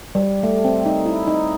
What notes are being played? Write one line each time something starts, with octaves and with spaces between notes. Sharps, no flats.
G3
A3
C4
D#4
E4
D#4